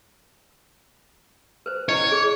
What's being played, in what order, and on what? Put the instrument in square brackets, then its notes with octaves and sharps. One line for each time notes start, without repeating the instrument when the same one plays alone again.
[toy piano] B4 C5
[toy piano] C#4 E4 D#5 [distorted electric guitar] C#5
[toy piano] G#4